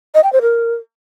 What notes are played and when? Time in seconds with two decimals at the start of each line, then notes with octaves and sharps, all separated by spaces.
0.15 D#5
0.24 G5
0.33 C5
0.42 A#4